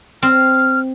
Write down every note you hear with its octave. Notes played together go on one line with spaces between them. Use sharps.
C4 F6